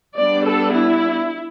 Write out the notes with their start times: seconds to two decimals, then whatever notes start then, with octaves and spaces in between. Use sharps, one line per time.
0.17 G3 B3 D4 D5
0.46 A4
0.75 E4